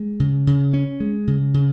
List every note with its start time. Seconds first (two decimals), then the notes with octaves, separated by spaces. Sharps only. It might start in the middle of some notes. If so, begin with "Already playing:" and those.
Already playing: G#3
0.20 C#3
0.47 C#3
0.73 C#4
1.00 G#3
1.27 C#3
1.54 C#3